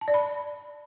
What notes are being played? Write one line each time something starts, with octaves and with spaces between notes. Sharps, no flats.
A5
D5
B5